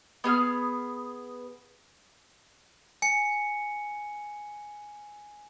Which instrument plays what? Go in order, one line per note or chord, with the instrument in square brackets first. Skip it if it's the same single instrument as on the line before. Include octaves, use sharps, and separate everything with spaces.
[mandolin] B3 G#4 F6
[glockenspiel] G#5 C#7